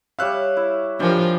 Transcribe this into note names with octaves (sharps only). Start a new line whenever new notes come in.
G3 C#5 E5 F5 F#6
E4
F3 G3 D4 G4 A#4 G#5